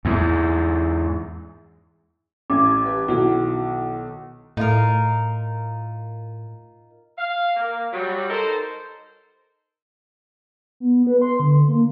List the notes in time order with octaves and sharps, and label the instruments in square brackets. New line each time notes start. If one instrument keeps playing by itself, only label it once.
[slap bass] E2 G#2
[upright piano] A1 [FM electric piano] C#4 G#6 [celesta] D6
[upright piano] G4 B4
[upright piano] B1 D#3 [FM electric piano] E4 F#4
[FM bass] A2 [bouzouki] D#4 F4 A#4
[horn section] F5
A#3
F#3 G3
D#4 A4 A#4 C5
[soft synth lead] B3
B4
C6
D3
A#3